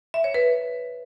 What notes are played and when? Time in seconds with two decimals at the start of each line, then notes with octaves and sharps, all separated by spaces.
0.14 E5
0.24 C#5
0.34 B4